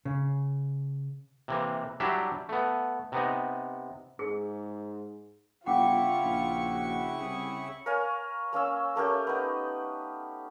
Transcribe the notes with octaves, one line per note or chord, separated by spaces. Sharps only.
C#3
C3 E3 A#3
F#3 G3 D4 E4 G4
A3 B3
C3 B3 D#4
G#2 G#4
G1 C#3 E4 F4 F#5 G5 C#6 D6
A#1
F#4
C2 G#4
A#4 C#5 F5 G#5
A#3 C#4 F5 E6
A3 A#3 C#4 G4
B3 D#4